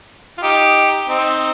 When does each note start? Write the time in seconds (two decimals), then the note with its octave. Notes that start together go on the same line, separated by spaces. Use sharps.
0.38 F4
0.42 D#4 G4
1.08 C4 D#4